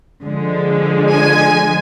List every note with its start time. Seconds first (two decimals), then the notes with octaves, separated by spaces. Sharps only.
0.23 D3 F3 G#3
1.11 G#5